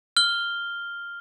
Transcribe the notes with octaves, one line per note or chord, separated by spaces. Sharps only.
F6 G7